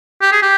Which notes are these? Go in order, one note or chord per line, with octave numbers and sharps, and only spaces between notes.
G4
G#4
G4